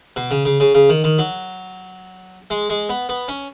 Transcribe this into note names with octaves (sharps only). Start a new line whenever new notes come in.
B2
C#3
C#3
C#3
C#3
D#3
D#3
F#3
G#3
G#3
B3
B3
C#4